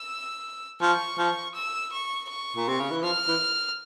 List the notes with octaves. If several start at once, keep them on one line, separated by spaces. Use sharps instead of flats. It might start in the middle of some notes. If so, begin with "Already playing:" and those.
Already playing: E6
F3 C#6
F3
E6
C#6
C#6
A#2
C3
C#3
E3
F3 F6
E3